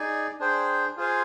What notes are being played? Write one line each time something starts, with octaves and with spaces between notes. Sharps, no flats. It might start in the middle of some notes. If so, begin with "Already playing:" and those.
Already playing: D#4 G#4 D5 G#5
D4 G#4 C5 G5
F4 G#4 C5 F5 G#5